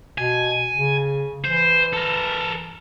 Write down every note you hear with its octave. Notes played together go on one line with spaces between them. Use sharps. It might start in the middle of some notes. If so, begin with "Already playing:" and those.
B2 G#5
C#3
E3 C5
A4 A#4